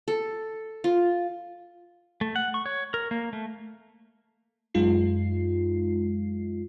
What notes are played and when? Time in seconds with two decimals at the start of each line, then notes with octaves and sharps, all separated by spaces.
0.08 A4
0.84 F4
2.21 A3
2.36 F#5
2.54 C#6
2.66 C#5
2.94 A#4
3.11 A#3
3.33 A3
4.74 F#2 G#3 D#4 F4 C7